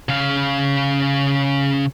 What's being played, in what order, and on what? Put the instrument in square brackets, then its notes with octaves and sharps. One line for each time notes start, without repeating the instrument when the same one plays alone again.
[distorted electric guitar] C#3 F5